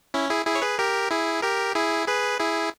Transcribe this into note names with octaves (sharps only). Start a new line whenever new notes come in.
C#4 E4
E4 G#4
E4 G#4
C#5
G#4 B4
G4 A#4
E4 G#4
G4 A#4
E4 G#4
G#4 B4
E4 G#4